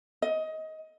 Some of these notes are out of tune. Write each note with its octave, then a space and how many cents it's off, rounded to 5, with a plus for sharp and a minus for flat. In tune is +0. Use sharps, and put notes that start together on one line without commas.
D#5 +20